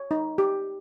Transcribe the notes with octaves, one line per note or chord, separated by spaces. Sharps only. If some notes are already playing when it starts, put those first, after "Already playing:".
Already playing: C#5
D#4
G4